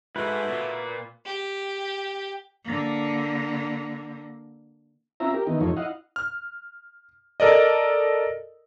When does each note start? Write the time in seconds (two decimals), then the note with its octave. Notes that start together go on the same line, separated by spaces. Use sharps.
0.16 G#2 A3 E4 F#4 B4 C5
0.48 A#2 F4
1.26 G4
2.64 D3 A#3
5.20 C4 C#4 E4 F4 E5 A#5
5.34 G4 A#4
5.47 D#3 E3 B3 D#4
5.61 F2 F3 A3 D#4 C#5
5.77 E4 D#5 F5 F#5
6.16 F6
7.40 A4 A#4 D5 D#5